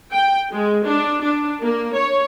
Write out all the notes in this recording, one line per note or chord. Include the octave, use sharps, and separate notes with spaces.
G5
G#3
D4
D4
A#3
C#5